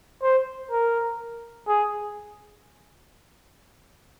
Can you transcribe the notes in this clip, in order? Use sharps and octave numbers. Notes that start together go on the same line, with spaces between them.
C5
A#4
G#4